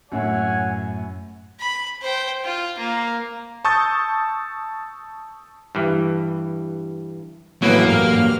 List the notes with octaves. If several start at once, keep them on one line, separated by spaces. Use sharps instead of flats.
F#2 A2 C#5 F#5 G#5
B5
C5 G5
F4
A#3
A5 C#6 D#6 E6 G6 A6
G2 E3
A1 F#3 A#3 B3 E4 B4
G2 F6